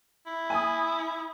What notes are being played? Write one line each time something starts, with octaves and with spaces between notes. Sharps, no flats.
E4
G#5 B5 D#6